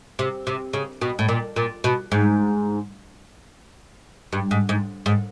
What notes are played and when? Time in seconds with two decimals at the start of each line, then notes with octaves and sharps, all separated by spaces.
0.19 C3
0.47 C3
0.73 C#3
1.01 B2
1.19 A2
1.28 A#2
1.56 A#2
1.84 B2
2.12 G#2
4.33 G2
4.51 G#2
4.69 G#2
5.06 G#2